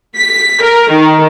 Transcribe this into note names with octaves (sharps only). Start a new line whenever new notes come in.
B6
A#4
D#3